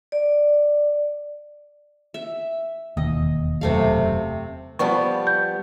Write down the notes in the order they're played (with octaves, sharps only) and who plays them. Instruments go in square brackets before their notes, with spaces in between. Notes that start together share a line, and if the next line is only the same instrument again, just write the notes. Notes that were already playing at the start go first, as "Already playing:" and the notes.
[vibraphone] D5
[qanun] E5
[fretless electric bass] E1 [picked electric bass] D#2 [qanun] D#5
[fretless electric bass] E1 F#2 [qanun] C3 A3 F5
[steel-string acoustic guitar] F3 G3 B3 [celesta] A5 C#6
[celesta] G6